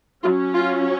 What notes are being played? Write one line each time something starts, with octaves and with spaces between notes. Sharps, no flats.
F#3 C#4 F4
F4